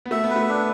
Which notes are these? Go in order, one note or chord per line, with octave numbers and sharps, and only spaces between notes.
B3
A3 E5
B3
B4
A3
D4